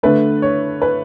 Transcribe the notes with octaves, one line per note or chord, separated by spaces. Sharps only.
D3 A3 B4
C#5
B4